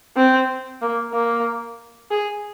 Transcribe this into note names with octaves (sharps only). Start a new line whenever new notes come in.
C4
A#3
A#3
G#4